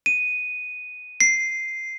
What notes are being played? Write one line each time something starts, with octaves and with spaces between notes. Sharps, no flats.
D#7
C7